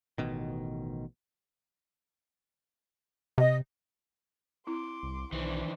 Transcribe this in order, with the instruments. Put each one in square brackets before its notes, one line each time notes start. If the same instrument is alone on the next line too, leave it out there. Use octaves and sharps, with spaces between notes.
[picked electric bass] A1 B2 D#3
[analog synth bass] C3 [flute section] D#5
[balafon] C4 E4 [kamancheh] C6 D6
[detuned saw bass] C2
[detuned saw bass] B1 [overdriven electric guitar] D#3 E3 [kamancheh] D4 C5